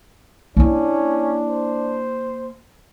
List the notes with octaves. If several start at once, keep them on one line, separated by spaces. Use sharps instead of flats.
A#3 C#4 D4 E4
C5